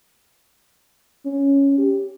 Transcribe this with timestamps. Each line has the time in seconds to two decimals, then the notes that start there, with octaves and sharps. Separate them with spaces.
1.25 C#4
1.78 G4